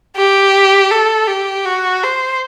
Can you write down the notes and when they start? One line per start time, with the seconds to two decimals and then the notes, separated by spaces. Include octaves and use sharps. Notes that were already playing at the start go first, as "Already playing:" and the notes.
0.16 G4
0.91 A4
1.27 G4
1.65 F#4
2.03 C5